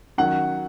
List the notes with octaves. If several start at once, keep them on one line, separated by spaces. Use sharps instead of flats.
D#3 F#3 C#4 F#5